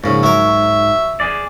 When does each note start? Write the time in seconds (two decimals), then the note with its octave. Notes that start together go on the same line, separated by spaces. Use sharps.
0.04 A#1 G#2 C#3
0.23 F#3 A#4 E5
1.20 G#4 D5